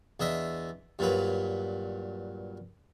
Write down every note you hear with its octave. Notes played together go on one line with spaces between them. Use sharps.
E2 D4 D#5 E5
G2 A#2 F#3 B4